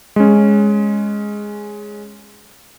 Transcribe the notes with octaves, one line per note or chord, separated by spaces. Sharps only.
G#3 C#4